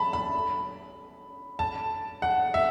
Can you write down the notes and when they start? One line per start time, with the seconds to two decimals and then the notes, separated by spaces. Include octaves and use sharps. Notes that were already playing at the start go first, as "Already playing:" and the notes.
Already playing: A5 B5
0.13 B5
1.59 A5
2.22 F#5
2.54 E5